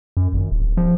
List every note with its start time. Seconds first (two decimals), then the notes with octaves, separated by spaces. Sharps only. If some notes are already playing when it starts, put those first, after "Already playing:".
0.17 F#2
0.34 G#1
0.51 D1
0.77 F3